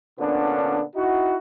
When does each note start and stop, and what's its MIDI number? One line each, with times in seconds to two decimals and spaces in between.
0.19 0.82 46
0.19 0.82 50
0.19 0.82 59
0.19 0.82 61
0.19 0.82 62
0.96 1.37 63
0.96 1.37 64
0.96 1.37 66